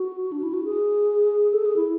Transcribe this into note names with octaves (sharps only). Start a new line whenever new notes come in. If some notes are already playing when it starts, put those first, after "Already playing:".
Already playing: F#4
D4
E4
F#4
G#4
A4
G#4
E4